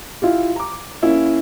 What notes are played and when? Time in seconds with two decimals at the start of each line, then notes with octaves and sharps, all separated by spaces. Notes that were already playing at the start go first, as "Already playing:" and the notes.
0.22 E4 F4 G4
0.56 A#5 D6
1.02 A#3 C#4 E4